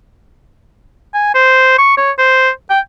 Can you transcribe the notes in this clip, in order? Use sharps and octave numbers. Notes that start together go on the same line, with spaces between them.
G#5
C5
C#6
C#5
C5
G5